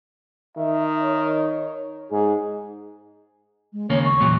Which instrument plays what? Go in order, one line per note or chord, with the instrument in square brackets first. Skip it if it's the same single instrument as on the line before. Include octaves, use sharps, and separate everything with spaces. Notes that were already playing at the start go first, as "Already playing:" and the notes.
[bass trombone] D#3 [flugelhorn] E5
[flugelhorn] C#5
[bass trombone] G#2 [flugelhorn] G#4
[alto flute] G#3
[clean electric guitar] D#2 C#3 A#3 [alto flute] C#5
[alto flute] C#6
[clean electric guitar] E2 A#2 F#3